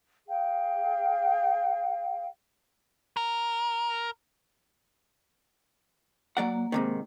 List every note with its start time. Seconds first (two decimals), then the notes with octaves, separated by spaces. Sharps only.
0.27 G#4 F5 G5
3.17 A#4
6.37 F#3 A#3 D5 F#5
6.72 G#2 C3 D#3